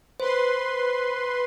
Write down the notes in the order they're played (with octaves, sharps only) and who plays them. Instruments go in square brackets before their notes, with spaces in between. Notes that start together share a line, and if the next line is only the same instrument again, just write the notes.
[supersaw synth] B4 C6 [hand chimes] C5